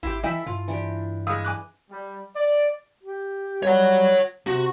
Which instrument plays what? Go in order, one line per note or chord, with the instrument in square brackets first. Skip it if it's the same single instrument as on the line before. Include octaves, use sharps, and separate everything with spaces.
[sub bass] G#1 [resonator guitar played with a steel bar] E4 G4 [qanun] C6
[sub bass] E3 [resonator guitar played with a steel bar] E4 E5 [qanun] A4 [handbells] D#5 G5 G#5
[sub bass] G2 [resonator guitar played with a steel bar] F4
[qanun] E3 D4 G4
[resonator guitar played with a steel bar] G3 G#3 [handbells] F5 D#6 E6
[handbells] G#5 D6 F#6
[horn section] G3
D5
[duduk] G4
[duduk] G3 [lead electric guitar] C#5 F#5
[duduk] C3 [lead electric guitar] F#4